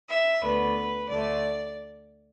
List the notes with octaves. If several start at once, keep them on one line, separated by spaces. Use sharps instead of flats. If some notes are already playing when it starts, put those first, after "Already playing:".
E5
D2 D3 B3 B4
D2 D3 A3 D5